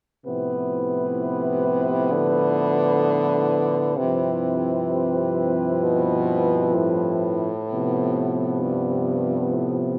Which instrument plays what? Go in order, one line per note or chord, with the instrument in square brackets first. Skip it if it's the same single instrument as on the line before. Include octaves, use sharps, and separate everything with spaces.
[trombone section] A2 F3 B3 E4 B4 [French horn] C3
[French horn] D3
[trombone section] G2 F3 C4 E4 B4 [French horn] C3
[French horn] B2
A2
[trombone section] C3 F3 B3
[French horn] G2
A2